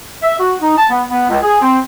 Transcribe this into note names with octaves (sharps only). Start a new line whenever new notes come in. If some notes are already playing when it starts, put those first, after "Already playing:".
E5
F#4
D#4
A5
B3
B3
C#2
G#4
C4